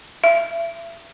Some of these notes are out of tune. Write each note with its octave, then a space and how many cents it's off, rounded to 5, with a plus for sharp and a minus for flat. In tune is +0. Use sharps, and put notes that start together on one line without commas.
E5 +30